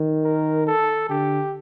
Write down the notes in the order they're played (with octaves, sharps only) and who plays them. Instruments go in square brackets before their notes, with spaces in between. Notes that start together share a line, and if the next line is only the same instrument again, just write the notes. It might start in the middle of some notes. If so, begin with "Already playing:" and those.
Already playing: [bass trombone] D#3
[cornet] A#4
A4
[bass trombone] D3 [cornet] G4